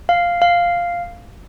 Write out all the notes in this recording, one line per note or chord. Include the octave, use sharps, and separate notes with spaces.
F5
F5